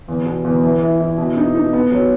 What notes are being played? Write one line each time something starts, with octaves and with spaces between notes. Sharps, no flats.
E2
B2
E2
E3
E4
E4
B2
D#4
D#4
B3
F#3